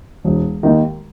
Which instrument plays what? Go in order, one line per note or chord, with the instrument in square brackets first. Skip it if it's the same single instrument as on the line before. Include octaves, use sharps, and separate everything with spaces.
[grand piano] E1
D#2 D#3